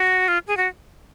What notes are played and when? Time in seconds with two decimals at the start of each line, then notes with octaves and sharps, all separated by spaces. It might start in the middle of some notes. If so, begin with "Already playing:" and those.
Already playing: F#4
0.28 F4
0.47 G#4
0.57 F#4